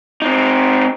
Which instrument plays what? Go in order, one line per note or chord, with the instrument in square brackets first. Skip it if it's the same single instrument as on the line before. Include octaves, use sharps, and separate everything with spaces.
[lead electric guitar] C4 D#4